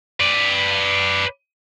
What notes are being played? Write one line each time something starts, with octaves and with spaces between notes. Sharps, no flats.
B4 D5